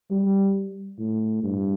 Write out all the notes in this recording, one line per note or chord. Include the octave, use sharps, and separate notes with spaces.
G3
A2
G2